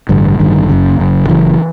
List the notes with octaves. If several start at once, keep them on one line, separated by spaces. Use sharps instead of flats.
A1 G2 D3
A1 G2 D3 D#3
F#1 F#2 C#3
F#1 F#2 C#3
F#1 F#2 C#3 E3